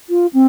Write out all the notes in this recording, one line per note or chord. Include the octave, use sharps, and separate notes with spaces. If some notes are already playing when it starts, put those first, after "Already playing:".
F4
C4